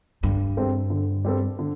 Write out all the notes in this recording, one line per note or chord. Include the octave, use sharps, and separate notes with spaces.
G2 D3
G3 C4 A4
D3
G3 C4 A4
D3